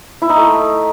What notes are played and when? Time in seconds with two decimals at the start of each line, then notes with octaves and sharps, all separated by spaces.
0.22 E4
0.29 D#4
0.37 A3